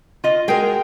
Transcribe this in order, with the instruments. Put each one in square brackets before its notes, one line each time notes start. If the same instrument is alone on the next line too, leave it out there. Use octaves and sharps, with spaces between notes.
[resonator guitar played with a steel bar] F4 D#5
[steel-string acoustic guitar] G#3 F#4 A#4 [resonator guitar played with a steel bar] G#4 G5